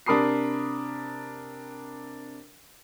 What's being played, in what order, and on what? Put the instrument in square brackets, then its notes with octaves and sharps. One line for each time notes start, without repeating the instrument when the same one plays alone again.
[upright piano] C3 D4 A#4 B5 D#6 C7